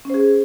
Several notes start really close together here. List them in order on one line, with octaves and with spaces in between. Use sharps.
C#4 C5 G#4